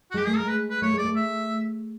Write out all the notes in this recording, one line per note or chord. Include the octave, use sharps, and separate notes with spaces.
F#4
G#3 G4
A3 G#4
G#3 A#4
B4
B4
A3 C#5
G#3 D5
A3
E5